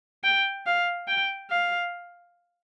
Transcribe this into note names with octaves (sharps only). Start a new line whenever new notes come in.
G5
F5
G5
F5